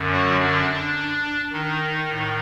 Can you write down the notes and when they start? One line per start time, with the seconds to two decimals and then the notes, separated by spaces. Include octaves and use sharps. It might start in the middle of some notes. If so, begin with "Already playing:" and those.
Already playing: F#2 D3
0.11 F#3 F#4
0.40 D4
1.52 D#3 D#4
2.09 A2